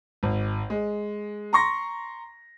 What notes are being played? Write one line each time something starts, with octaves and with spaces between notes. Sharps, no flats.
G#1
G#3
A#5 C6 C#6 A#6